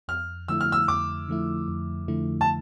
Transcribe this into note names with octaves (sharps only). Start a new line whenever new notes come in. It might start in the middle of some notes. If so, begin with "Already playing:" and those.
F2 F6
D3 F3 A3 E4 E6
F6
E6
F2 D6
D3 F3 A3 E4
F2
D3 F3 A3 E4
A5